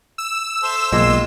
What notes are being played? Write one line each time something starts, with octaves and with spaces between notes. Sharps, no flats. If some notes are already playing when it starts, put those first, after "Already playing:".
E6
A4 C5 E5
B1 A#2 G#3 F4 G4 C6